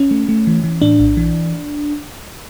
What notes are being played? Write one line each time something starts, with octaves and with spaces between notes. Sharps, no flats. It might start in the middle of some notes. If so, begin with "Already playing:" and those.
Already playing: C#4
A3
A3
E3
E3
A2 D4
A#1
E3